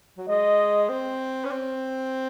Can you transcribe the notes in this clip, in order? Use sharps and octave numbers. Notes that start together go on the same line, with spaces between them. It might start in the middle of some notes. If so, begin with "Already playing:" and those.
F#3
G#3 D#5
C4
C#4
C4